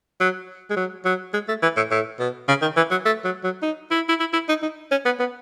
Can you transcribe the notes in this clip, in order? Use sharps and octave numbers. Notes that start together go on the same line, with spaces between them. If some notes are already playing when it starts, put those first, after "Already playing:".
F#3
G#3
F#3
F#3
G#3
A3
E3
A2
A2
B2
C#3
D#3
E3
F#3
A3
F#3
F#3
D#4
E4
E4
E4
E4
D#4
D#4
C#4
B3
B3